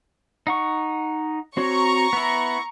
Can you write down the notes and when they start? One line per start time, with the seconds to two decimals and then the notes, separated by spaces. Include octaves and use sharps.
0.47 D#4 F#5 C#6
1.57 C4 F#4 C#5 A#5 C#6
2.13 B3 E4